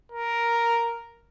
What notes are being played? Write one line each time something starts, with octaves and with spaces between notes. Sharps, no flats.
A#4